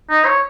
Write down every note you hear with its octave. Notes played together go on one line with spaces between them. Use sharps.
D#4
C#5